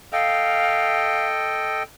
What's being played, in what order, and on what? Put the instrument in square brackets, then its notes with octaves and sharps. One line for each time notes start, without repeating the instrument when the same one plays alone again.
[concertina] A4 D#5 G5 [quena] F5